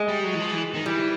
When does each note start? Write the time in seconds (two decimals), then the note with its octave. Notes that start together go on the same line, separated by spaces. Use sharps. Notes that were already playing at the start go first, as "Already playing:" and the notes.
Already playing: G#3
0.08 G3
0.24 F#3
0.34 E3
0.40 F3
0.51 E3
0.74 D#3
0.86 E3 G3